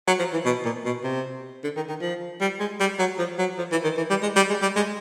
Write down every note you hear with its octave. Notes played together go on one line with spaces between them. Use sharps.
F#3
F3
E3
B2
A#2
B2
C3
D3
D#3
D#3
F3
G3
G#3
G3
F#3
F3
F#3
F3
E3
D#3
E3
G3
G#3
G3
G#3
G3
G#3